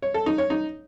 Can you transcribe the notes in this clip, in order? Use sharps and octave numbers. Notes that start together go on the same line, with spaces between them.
C#5
A4
D#4
C#5
D#4